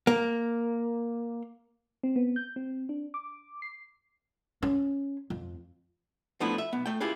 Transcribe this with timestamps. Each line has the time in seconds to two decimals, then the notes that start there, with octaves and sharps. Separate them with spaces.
0.07 A#3
2.03 C4
2.16 B3
2.36 G6
2.56 C4
2.89 D4
3.14 D6
3.62 C7
4.62 C#4
5.30 F2
6.40 F3 A3 B3 D4 E4
6.58 E5
6.73 B1 B3
6.86 A3 G5
7.00 E4 F4 G4 G#4 B4